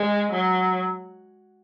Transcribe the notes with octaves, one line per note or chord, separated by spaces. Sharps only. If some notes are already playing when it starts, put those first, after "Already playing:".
Already playing: G#3
F#3